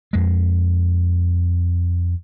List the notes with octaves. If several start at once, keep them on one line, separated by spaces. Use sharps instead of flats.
F2 G#3